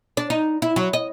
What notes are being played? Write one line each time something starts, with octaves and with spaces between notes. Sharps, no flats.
D4
D#4
E4
F#3
D#5